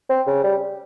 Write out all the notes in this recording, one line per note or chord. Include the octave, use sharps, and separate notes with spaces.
C4
C#3
G3